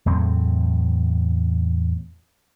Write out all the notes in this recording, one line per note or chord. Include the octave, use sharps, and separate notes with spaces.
E2 A2 F#3 C4